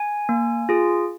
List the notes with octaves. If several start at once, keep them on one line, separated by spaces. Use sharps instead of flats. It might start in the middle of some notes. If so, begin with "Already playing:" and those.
Already playing: G#5
A#3
F4 G#4